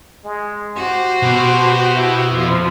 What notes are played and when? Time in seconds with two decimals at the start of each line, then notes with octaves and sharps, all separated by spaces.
0.25 G#3
0.76 F#4 G4 C5 C6
1.23 B2
1.96 E4
2.32 F2 F3